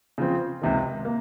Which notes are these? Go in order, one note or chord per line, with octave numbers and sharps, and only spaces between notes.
C#3 F3 C4
C#2 C3 D#3
A#3